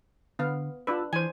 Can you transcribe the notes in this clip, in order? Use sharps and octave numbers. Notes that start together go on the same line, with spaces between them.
D3 B3 F5
D4 F4 B4 E6
E3 C5 G#5